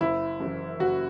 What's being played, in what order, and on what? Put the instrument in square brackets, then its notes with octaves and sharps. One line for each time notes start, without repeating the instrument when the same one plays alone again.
[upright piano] F#1 E4
F#2 E3
F#1 F#4